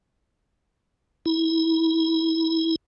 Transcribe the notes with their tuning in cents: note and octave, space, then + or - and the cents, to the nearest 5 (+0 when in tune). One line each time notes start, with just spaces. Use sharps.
E4 -25